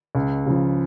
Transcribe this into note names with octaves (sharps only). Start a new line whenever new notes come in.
C#2
C#3 F3